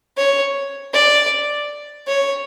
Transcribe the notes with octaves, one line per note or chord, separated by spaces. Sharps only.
C#5
D5
C#5